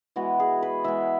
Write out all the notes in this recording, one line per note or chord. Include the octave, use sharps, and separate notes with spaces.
E3 G#3 B3 F#4
G#4
B4
E3 G#3 B3 E5